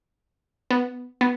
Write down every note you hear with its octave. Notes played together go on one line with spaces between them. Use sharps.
B3
B3